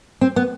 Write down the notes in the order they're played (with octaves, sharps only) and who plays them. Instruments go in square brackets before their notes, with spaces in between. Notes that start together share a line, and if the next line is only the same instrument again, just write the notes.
[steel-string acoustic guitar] C4
B3